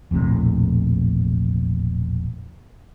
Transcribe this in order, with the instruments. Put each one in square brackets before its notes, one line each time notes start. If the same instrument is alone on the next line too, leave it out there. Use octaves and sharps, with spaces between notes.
[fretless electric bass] E1 A#1 A2 C3